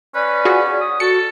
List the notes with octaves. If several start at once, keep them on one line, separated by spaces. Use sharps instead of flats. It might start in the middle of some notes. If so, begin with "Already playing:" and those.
C#4 B4 D5
F4 F#4 G#4
D#6
F#4 A4 C#7